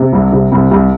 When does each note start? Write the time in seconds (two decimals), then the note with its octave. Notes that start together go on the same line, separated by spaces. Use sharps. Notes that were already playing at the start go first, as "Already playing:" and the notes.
Already playing: C3
0.13 C2
0.32 C3
0.52 C2
0.71 C2